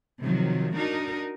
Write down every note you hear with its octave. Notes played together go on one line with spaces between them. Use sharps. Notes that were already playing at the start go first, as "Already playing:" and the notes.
C3 D#3 F3 F#3
D4 D#4 F#4 A#4